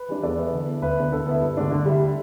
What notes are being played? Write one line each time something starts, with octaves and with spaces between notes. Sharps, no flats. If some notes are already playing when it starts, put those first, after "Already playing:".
Already playing: B4
E3 G3 D4
E2 A4 D5
E3 B3 E4
D3
B3 E4
D2 B4 E5
D3 B3 E4
D3 A4
B3 E4
G2
D3 A3 D4
D3
G3 E4